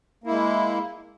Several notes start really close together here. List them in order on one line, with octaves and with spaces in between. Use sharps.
A#3 E4 G#3